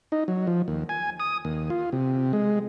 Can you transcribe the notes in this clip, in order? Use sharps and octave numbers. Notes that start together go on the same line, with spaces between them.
D#4
F#3
F3
D#2
G#5
D#6
D#2
F4
C3
G#3